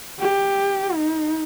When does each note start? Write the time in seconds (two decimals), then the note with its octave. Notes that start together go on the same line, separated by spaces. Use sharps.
0.19 G4
0.94 D#4